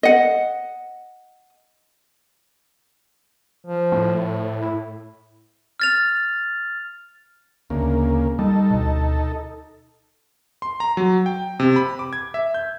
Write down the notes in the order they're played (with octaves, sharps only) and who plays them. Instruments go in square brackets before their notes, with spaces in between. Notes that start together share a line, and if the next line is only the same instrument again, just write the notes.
[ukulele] D#5 F#5
[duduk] F3
[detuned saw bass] A2
[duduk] E4
[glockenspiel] F6 A6 F7
[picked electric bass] D2 [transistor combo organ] C#3 A#3
[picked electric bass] G3 [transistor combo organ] D#4 A4
[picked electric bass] D2 B2
[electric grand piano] C6
A#5
F#3
G5
C3
B5
D6
G#6
E5
G6